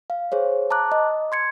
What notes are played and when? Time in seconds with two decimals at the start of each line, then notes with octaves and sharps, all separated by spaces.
0.10 F5
0.32 G#4 C5 C#5
0.70 A5 A#5 D6 F#6
0.92 D#5
1.32 C6 G#6 C#7